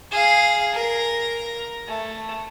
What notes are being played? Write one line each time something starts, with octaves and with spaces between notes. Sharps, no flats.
G#4 F5
A#4
A3